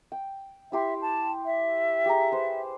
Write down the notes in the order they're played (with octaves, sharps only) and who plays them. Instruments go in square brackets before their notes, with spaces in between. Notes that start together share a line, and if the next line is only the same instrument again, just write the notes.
[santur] G5
[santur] E4 G4 C6 [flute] E5
[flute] A5
E5
[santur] G4 G#4 A#5
B4 C5